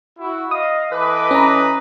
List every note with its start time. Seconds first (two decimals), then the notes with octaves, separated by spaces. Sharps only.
0.19 E4 F#4
0.51 D#5 F5 D#6
0.91 E3 A4 B4 D#5 D6
1.31 C#4 A#5